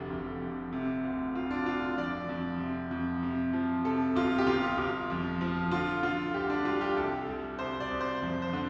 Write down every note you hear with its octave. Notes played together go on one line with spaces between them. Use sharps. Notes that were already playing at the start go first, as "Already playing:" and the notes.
Already playing: F1 D3 G4
F1
F2
C3
D2
D2 F4
D4
D2 F4
F2 D5
F2
C3
F2
C3
F3
C3 A4
G1 F4
G4
G1 F4
G1
F2
F3
D3 F4
D3 F4
D2 G4
D4
G3 F4
G4
C2 A4
G3
C2 C5
D5
C2
C5
F2
C5
D3